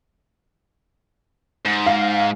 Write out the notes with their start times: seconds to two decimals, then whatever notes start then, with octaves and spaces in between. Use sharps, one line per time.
1.66 G#2
1.86 F5